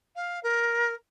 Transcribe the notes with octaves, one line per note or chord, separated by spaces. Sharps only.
F5
A#4